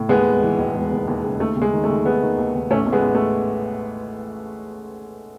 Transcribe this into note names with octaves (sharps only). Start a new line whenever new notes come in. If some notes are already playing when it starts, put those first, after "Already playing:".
Already playing: A2
D#2 G#3 B3
E1
E3
E1
E1
D#2
D#2
C#3
D#2 A3
D#2
G#3
D#3
A3
D#2
D#2 G#3 B3
D#3
D#2
D#2
A1 A3 C#4
A1
G#3 B3
A1
A3